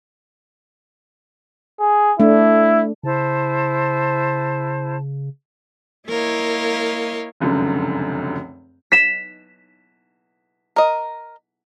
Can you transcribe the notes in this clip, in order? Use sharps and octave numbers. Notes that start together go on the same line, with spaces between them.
G#4
A3 D4 E4
C#3 E4 C5 A5
A#3 E4 A#4 C#5 D#5 F5
F1 C#2 F#2 D3
B6 E7
A#4 D#5